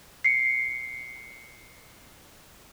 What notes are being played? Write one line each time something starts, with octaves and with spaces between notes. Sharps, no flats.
C7 C#7